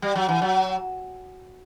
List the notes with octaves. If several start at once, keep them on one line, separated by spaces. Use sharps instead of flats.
G3
F#3
E3
F#3